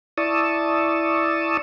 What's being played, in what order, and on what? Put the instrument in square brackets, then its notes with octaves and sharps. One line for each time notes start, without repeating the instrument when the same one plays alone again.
[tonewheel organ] E4 D5 A5 C#6 D#6 E6